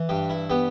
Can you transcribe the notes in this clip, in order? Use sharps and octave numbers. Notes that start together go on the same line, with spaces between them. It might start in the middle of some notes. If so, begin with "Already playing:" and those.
Already playing: E3
G2 G4
E4
B3 G4